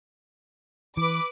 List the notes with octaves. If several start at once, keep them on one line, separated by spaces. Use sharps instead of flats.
E3 B4 D6